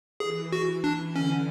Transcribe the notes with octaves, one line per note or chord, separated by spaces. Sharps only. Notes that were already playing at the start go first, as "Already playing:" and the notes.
E3 G#4
F#4
D4
D3 C#4